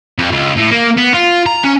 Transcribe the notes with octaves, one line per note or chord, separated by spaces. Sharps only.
F2
C#2
A2
A#3
B3
F4
A#5
C#4